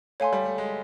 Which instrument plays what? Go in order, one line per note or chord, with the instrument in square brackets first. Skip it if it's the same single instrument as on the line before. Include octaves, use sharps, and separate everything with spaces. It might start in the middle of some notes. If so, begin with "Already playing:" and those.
[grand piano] A3 [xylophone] C#5 F5 G#5 C6
[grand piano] G3
A3
G#3